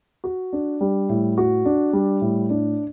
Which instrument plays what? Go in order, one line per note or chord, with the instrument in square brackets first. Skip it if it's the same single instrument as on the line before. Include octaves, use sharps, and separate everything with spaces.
[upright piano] F#4
D4
G3
A2
F#4
D4
G3
A2
D4